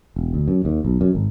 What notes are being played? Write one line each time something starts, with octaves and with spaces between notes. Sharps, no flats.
E1
D2
F#2
D#2
B1
F#2
G#1